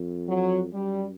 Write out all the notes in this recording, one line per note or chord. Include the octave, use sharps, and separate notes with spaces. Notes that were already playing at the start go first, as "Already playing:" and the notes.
Already playing: F2
F#3
F#2 G3